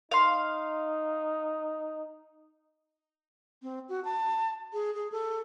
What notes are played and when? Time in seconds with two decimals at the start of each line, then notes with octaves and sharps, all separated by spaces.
0.11 D#4 F5 C6
3.63 C4
3.89 F#4
4.05 A5
4.73 G#4
4.94 G#4
5.12 A4